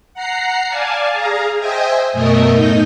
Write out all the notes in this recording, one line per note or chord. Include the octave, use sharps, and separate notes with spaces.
F#5 A#5 C7
D5 F5 G#5 A5
G#4 F5 A#5
C5 D#5 E5 G5 G#5
F#2 B2 A3 A#4 D#5 E5
A2 D#4 D#5 G6